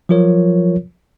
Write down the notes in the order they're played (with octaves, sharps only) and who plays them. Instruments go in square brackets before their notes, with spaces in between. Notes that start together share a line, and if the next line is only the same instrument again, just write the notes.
[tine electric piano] F3 F#3 F4 A#4 C#5